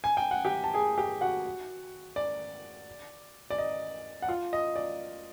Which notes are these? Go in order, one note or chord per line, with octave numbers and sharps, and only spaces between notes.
G#5
G5
F#5
G4 G5
A5
G#4 G#5
G4 G5
F#4 F#5
D5
D5
D#5
F#5
F4 F5
D#5
D5